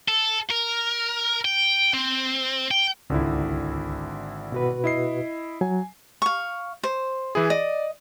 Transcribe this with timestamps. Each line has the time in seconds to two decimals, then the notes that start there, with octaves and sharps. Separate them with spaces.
0.09 A4
0.51 A#4
1.45 G5
1.94 C4
2.71 G5
3.10 G#1 C#2 D3 E4
4.52 B2 F#4 B4
4.84 E4 D#5 C7
5.61 F#3 G#5
6.22 F5 C#6
6.83 C5
7.35 E3 E4 G#4
7.50 D5 D#5